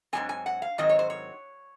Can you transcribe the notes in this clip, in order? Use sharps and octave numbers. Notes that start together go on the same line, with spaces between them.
G#2 D#3 F#3 C4 G#5
G#5
F#5
F5
G#2 D#3 F#3 C4 D#5
C#5
C5
C#5